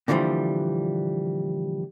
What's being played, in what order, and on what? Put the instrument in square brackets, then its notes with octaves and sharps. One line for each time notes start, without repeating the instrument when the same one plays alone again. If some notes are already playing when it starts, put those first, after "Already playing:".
[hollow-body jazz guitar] A#2 D3 E3 F3 G3